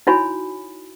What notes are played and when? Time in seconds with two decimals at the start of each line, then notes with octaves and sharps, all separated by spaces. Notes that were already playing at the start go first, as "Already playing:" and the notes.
0.07 D#4 E4 F#4 C#5 G#5 B5